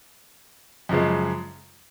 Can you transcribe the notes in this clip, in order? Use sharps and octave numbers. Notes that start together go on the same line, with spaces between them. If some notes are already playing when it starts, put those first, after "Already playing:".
F#2 C#3 F3 G#3